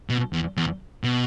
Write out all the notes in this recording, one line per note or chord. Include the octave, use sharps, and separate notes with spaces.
B2
E2
E2
B2